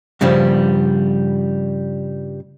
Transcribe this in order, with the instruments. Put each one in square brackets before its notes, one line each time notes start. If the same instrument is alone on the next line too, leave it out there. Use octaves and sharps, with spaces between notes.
[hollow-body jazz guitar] G2 C#3 F3 G3